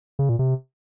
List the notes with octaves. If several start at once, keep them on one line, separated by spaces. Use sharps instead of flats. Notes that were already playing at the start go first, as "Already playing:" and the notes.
C#3
A#2
C3